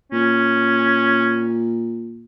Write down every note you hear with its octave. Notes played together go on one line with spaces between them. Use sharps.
A#2 C#4